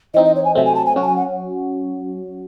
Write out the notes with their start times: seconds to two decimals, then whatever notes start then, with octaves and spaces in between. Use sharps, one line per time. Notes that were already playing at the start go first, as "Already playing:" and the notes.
0.14 E3 C4 D#4 D#5
0.25 D#5
0.35 C#5
0.44 G#5
0.55 C3 F#3 A3 C4 E5
0.65 G#5
0.75 A5
0.86 G#5
0.96 F#3 C#4 F#4
1.02 A5
1.06 G#5
1.16 F#5